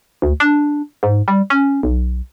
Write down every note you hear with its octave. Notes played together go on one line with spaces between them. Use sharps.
D2
D4
G#2
G3
C#4
B1